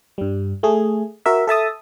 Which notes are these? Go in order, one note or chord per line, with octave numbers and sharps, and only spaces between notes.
G2 G3
A3 G#4
F#4 A#4 E5
A4 E5 A5 D#6